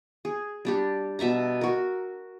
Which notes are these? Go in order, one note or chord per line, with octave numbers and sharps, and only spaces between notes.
G#4
G3 D4 G4
B2 E5 A5 A#5
F#4 A#4